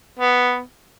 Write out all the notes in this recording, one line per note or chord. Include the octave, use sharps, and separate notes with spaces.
B3